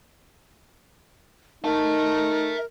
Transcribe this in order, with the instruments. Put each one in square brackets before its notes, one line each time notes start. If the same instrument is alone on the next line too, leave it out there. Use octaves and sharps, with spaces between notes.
[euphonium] D#4 [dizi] A#4 [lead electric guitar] E5 A5